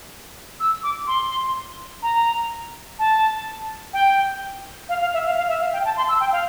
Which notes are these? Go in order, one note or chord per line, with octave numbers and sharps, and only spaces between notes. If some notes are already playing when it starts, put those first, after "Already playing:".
E6
D6
C6
A#5
A5
G5
F5
F5
E5
F5
F5
E5
F5
G5
A5
C6
E6
G5
F5